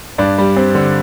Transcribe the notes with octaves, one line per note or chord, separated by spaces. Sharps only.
G2 D4
G3
C4
D3